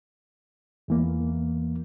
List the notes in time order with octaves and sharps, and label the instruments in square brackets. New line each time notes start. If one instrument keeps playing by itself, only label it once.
[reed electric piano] E2 E3 A#3